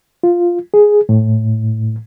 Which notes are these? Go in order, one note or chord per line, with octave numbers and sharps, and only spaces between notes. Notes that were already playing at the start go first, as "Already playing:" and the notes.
F4
G#4
A2